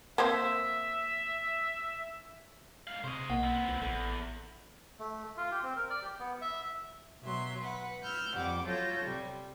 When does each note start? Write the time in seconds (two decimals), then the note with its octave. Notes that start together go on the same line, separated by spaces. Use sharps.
0.18 A#3 C4 C5 E5
2.87 G#2 F5
3.04 C3 C5 D#5 C#6
3.30 B1 A#3 F#5
3.43 B3 C4
3.68 C2
3.82 A1 E2 A4
4.99 A3
5.37 F4
5.51 G4
5.63 C4
5.77 A#4
5.90 D5
6.02 G4
6.19 B3
6.41 E5
7.22 B2 F#3 E5 C6
7.60 B4 F#5
8.03 E6 F6 G6
8.35 F2 G3 F#5 D6
8.65 F#3 F4 A4 C#5 G6 A#6
9.04 C3 G3